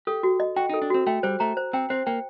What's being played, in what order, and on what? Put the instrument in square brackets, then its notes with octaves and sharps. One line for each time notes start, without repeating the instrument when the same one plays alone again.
[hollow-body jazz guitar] G4 [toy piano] A4
[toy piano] F#4
D#5
[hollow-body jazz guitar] F#4 [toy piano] G5
[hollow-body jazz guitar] D#4
[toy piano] A4
[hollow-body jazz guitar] D4
[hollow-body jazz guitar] C4 [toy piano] F#4
[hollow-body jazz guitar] A3 [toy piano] G5
[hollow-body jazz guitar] G3 [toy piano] C5
[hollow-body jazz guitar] A3 [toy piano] A#5
[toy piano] C5
[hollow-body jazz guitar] C4 [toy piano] G5
[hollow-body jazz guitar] C4 [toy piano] C5
[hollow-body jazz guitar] A#3 [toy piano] G5